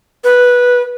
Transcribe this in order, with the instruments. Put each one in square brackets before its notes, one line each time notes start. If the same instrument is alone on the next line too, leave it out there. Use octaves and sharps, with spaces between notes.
[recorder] B4